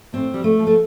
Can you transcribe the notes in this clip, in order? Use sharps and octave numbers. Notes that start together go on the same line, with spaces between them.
A2 C4
G3
A3
F3
A3